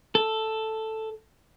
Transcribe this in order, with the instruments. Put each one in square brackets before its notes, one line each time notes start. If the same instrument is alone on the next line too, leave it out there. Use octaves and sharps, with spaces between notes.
[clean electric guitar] A4